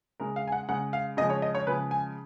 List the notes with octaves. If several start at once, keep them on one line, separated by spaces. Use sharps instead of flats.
C#3 G#3 A#4
F5
G#5
F#5
C#3 G#3 F#5
F5
C#3 F3 G#3 D#5
C#5
D#5
C#5
C#3 F3 G#3 B4
G#5